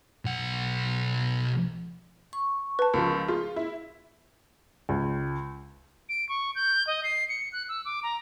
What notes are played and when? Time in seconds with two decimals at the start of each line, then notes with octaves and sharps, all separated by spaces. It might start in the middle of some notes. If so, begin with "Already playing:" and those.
0.25 B1 F#5
2.33 C#6
2.79 B4 A5
2.94 C#2 F3 A#4
3.28 F4 G#4
3.56 E4
4.89 C#2
6.09 D7
6.29 C#6
6.55 G6
6.87 D#5
7.03 C7
7.29 C#7
7.52 F#6
7.69 E6
7.85 D6
8.03 A#5